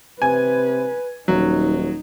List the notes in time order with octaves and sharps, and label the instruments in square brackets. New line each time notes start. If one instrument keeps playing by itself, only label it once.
[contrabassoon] C3 [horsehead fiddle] B4 [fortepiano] G#5
[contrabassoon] D#1 [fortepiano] F#3 [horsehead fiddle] D#4